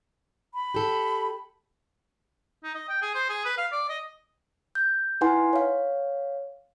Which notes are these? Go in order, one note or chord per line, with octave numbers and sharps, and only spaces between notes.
B5
G4 A4
D#4
D#5
G5
G#4
C5
G#4
B4
F5
D5
D#5
G6
D#4 E4 B4 F#5 G#5 C6
C#5 F5